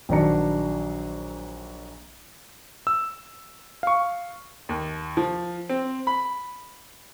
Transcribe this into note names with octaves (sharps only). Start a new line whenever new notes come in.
A#1 D#3 F#3 D4 A#5 C#7
E6
F5 C#6
D#2
F3
C4
B5